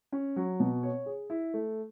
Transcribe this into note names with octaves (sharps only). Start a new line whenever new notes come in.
C#4
F#3
B2
C#5
G#4
E4
A3